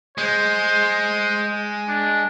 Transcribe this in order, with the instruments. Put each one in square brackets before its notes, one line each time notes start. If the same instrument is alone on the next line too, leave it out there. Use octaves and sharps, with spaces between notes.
[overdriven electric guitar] G#3 [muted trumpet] C5
[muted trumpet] D4